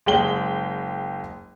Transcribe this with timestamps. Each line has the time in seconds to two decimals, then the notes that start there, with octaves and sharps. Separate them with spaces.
0.06 F#1 G#3 G5 G7